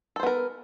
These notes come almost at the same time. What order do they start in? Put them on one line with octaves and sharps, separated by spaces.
A4 C5 B3 A#4